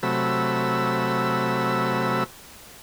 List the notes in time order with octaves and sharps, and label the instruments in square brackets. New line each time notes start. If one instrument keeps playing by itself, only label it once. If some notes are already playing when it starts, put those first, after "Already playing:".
[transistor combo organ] C3 F#3 A3 B5 E6